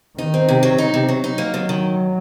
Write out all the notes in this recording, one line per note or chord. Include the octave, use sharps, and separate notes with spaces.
D#3 D#4
C4
C3
F#3
D#4
C3
F#3
D#4
F#3 A#3
D#3
D#3